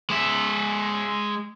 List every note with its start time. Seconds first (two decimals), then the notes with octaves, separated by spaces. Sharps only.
0.10 G#3 E5